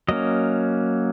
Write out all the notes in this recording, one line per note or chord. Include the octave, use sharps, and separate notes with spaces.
F#3 A#3 C#4 D#5